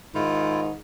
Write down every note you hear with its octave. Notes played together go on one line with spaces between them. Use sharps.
G#2 D#3 E4 F4